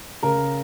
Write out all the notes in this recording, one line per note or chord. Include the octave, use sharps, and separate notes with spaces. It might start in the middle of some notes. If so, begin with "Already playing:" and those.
C#3 A#4 A#5